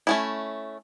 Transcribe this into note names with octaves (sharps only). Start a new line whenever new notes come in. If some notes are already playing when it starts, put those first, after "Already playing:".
A3 C#4 E4